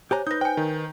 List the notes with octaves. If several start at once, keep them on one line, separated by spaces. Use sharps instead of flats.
G4 C5 C#5 G#5 A#5
D#4 B4 D#6 G6 A#6
C5 G5 G#5
D#3